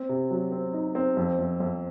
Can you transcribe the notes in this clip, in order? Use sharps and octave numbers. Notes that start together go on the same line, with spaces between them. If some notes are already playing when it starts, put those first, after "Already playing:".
Already playing: C4
C3
F#3
C4
D#4
C4
F2
F2
F2